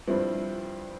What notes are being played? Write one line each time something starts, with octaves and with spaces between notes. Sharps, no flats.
G2 F3 C4 E4